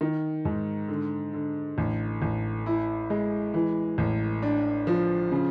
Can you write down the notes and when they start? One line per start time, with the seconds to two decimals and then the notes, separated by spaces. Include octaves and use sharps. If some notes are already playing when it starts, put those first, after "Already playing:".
0.01 D#3
0.45 G#2
0.88 D3
1.34 D3
1.78 A1
2.22 A1
2.66 E4
3.10 G#3
3.54 E3
3.98 A1
4.42 D4
4.87 F3
5.32 C#3